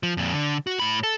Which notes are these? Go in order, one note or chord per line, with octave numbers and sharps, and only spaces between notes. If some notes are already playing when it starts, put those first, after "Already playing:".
F3
F2 A#2
D3
F#4
A2 B5
A4